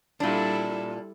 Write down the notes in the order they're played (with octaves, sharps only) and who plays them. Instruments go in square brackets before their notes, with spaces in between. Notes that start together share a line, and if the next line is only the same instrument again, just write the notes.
[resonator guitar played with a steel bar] A#2 D4 [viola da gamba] G3 E4 A4